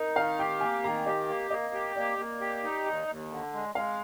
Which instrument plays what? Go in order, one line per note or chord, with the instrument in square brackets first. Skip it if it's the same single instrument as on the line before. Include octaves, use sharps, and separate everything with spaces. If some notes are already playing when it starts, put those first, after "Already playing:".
Already playing: [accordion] D#4 [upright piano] A#4
[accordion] D#3 [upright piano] F5
[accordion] G4 [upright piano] G5
[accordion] A#3 [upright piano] G#5
[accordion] D#3 [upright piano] A#5
[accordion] G4 [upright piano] D#5
[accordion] A#3
[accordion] A#3 [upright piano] D#5
[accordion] G4
[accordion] A#3 [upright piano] D5
[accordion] A#3
G4
D#4
D#2
D#2
D3
G#3
[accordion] G#3 [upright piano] F5